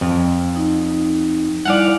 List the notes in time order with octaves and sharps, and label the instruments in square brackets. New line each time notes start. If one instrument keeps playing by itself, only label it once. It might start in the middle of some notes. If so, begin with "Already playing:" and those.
[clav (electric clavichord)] F2
[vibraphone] D#4
[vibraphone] G3 E4 G#5 [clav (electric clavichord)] D5 F5 F#5